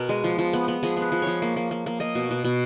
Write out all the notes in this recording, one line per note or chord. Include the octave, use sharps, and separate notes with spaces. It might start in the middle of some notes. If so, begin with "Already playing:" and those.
Already playing: B2 B3 A#4
G#3
F3
F3
B3
B3
F3 G#4
B3
B4
F3
F3 C#5
A#3
A#3
A#3
A#3
A#3 D#5
B2
B2
B2